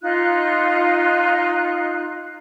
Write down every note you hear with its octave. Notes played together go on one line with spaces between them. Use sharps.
D#4 F4 F#6